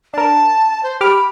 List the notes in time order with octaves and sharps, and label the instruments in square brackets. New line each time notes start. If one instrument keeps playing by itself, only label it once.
[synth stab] D4 A#4 [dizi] A5
[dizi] C5
[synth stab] G4 D6 F6 [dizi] B5